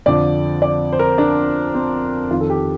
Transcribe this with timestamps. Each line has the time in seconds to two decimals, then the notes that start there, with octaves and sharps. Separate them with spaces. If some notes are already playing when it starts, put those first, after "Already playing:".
0.06 F2 D3 F3 D5
0.62 D5
0.93 C5
0.99 A#4
1.18 D4
1.75 C4
2.31 F2 D#3 F4
2.41 A4
2.50 G4